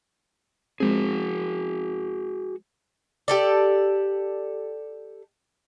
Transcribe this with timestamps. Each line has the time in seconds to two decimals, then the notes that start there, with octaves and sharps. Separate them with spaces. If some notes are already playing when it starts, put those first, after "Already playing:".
0.80 F3 G#3 C4 F#4 G#4
3.28 G4 A4 D5